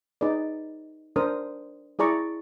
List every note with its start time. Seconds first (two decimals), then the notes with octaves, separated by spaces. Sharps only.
0.21 D#4 G#4 B4 D5
1.16 D4 A#4 C5 D#6
1.99 E4 G#4 D5 A#5 C#6